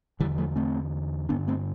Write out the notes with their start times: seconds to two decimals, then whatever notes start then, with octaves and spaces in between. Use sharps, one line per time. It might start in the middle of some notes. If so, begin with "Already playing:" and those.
0.20 E2 D3 E3 G3
0.38 F3 A3
0.56 A3 C4
1.29 G2 D3 B3 D4
1.48 A3 C4